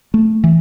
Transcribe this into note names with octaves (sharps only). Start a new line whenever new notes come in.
A3
E3